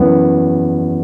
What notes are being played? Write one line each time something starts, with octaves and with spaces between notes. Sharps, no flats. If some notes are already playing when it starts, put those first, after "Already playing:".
Already playing: F#2 E3 B3